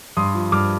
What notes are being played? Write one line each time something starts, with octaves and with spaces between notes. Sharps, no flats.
G2 C6 D#6
F3
G2 D6 F6